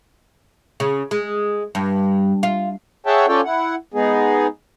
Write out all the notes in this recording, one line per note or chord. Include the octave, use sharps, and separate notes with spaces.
C#3
G#3
G2
F4
G#4 C#5 E5 F#5 G5 A5
C#4 F4 A4 C#5 D5 G5
E4 F#5
G#3 B3 D#4 G#4